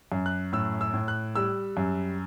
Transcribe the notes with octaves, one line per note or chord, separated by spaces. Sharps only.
F#2
F#6
A2 E6
E6
A2
F#6
G3 E6
F#2